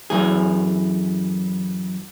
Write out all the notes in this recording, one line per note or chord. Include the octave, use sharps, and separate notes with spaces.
F#2 E3 G#4